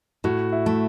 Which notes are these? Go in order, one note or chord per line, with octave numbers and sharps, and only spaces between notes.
A2 F#4
E4
A3